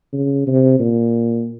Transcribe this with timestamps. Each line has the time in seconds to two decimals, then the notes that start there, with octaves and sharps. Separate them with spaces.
0.13 C#3
0.47 C3
0.79 A#2